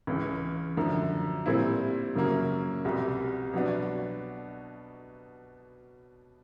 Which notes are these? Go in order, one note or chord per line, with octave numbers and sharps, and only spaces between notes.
C#2 C#3 E3
F#2 D3 F3
A#2 G3 C4 E4
F#2 C#3 F#3 A#3
C2 B2 G3
B2 F#3 B3 D4